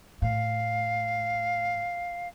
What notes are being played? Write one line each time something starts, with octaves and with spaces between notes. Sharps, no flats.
A2 F5